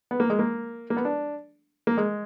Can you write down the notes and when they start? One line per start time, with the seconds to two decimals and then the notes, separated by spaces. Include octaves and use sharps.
0.11 B3
0.20 A#3
0.30 G#3
0.39 A#3
0.90 A#3
0.97 B3
1.05 D4
1.87 A#3
1.97 G#3